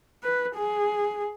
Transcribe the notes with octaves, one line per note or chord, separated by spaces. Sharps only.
B4
G#4